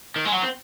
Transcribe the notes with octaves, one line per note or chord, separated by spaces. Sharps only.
D#3
G#3
F#3
C4